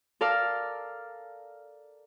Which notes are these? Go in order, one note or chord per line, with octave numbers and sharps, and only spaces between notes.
A4 A#4 D5 F5